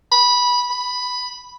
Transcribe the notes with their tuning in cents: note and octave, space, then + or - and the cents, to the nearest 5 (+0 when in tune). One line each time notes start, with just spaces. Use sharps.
B5 -15
B5 +5